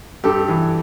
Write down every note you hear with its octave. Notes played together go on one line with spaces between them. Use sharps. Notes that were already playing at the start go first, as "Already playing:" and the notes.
G2 G4 A4
E3